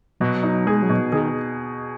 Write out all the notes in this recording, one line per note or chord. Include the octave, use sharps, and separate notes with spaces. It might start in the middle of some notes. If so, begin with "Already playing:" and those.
B2 F#3
D#4
G#3 G#4
F#3
B2
D#3 G#4